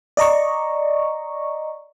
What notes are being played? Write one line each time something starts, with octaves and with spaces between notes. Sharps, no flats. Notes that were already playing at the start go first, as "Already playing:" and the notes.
D5 D#5 A#5 C#6